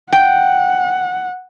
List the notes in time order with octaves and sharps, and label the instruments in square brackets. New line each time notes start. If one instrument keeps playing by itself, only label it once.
[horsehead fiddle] F#5 [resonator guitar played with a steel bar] G5